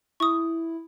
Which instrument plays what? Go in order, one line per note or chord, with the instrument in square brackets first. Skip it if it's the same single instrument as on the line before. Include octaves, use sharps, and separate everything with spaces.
[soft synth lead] E4 [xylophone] C#6 D#6